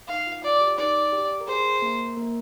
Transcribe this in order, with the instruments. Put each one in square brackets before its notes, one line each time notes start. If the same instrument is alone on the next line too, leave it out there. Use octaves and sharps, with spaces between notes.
[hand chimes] D#4 [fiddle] F5
[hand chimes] F4
[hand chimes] F4 [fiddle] D5
[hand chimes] G4
[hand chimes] D#4 [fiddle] D5
[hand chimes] G4
A#4
[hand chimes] G#4 [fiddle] C5
[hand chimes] A#3 A#4
A#3 A#4